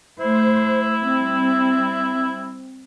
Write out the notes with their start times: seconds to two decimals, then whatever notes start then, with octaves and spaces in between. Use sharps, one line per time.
0.20 A3 E4 C5
1.00 G3 C4